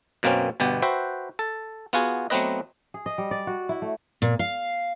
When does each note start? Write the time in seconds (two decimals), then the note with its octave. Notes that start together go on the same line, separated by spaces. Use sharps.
0.23 F#2 B2 A#3 C4 C#4
0.60 G1 B2 B3 G4
0.82 F#4 B4 C5 E5 G5
1.39 A4
1.93 B3 F4 F#4 G#4
2.30 F#3 A3 B3 C4 B4 D#5
2.94 G#4
3.06 D#5
3.18 G3
3.31 D5
3.47 F#4
3.69 E4
3.82 A3
4.22 A#2
4.39 F5